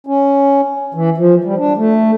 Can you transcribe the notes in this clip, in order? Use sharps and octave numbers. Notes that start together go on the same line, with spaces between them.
C#4
E3
F3
G3
D4
A3